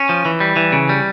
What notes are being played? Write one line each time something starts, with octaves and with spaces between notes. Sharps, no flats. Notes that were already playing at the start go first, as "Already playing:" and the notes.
Already playing: C#4
F3
E3
G3
E3
C#3
G3